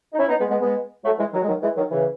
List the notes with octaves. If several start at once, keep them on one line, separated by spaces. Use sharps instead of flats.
D#4
C#4 E4
B3 D#4
G#3 B3
G#3 B3
G#3 B3
F#3 A3
E3 G#3
D#3 F#3
G#3
D#3 F#3
E3 G#3
D#3 F#3
C#3 E3